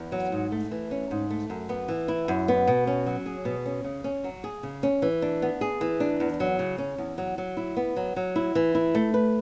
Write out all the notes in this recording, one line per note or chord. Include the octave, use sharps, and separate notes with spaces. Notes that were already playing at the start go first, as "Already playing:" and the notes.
Already playing: E2
F#3
G#2
A3
E3
C#4
G#2
A3
F#2
B3
E3
E4
F#2
B3
B2
C#4
F#3
G#4
B2
C#4
C#3
C#4
F#3
G#4
C#3
C#4
E3
D4
B3
G#4
E3
D4
E2
F#3
C#3
C#4
E2
F#3
F#3
E4
B3
F#3
F#3
E4
E3
E4
A3
B4